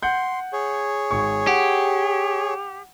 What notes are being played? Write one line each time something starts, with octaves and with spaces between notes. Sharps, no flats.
F#5 C6 G6
G#4 C#5
G#1 C#6
G4 F#5